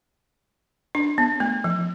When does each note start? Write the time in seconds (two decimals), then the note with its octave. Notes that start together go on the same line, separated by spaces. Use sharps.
0.95 D4
1.18 B3
1.40 A3
1.64 F3